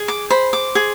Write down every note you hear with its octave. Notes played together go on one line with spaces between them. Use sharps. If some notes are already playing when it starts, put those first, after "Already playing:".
Already playing: G#4
D6
C5 B5
D6
G#4